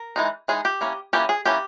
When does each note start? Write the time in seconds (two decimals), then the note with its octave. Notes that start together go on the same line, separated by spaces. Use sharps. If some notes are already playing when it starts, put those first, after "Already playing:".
Already playing: A#4
0.16 E3 G#3 D#4
0.48 E3 G#3 D#4 G#4
0.65 G4
0.81 E3 A#3 C#4
1.13 E3 A#3 C#4 G4
1.29 G#4
1.45 E3 A#3 C#4 G4